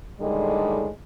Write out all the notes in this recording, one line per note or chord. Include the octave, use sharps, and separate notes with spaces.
A2 D3 D#3 G3 G#3